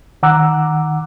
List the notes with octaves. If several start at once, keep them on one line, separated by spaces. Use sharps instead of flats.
D#3 F#5 A#5 D6 E6 F#6